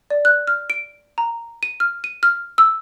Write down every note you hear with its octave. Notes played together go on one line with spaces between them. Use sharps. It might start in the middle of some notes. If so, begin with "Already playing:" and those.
D5
F#6
F6
D7
A#5
D#7
F6
D#7
F6
E6